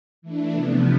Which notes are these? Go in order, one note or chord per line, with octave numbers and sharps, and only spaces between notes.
E3 A3 D4
C3 F3 B3